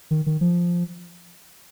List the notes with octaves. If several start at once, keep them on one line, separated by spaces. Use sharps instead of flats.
D#3
D#3
F3